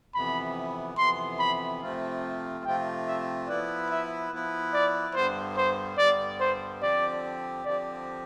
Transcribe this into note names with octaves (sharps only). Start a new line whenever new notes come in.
F2 C3 E3 B3 B5
F2 C3 E3 B3 C6
B5
C3 F3 A3 C4 F4
C3 F3 A3 C4 F4 G5
E5
F3 B3 E4 B4 D5
E5
F3 B3 E4 B4
D5
G2 D3 G3 B3 C5
C5
G2 D3 G3 B3 D5
C5
D3 F3 C4 G4 D5
D3 F3 C4 G4 D5